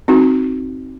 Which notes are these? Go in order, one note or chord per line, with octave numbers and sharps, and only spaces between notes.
C4 D#4 F#4